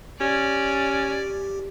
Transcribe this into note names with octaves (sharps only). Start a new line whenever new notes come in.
C#4 G4 D5